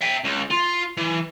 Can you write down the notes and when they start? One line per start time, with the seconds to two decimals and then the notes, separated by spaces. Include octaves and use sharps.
0.02 E5 G5
0.24 C#2
0.51 F4
0.98 E3